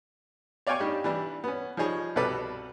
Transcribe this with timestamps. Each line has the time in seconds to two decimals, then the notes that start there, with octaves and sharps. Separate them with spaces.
0.67 C#5 D5 F5 G5 G#5 C#6
0.80 G3 D4 D#4 G4
1.04 E3 G3 D4
1.44 B3 C#4
1.77 F3 G3 D#4 G#4 C#5
2.16 C2 B2 G3 A4 B4 D5